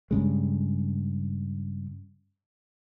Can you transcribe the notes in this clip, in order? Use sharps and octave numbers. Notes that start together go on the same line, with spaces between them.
G2 C#3 G#3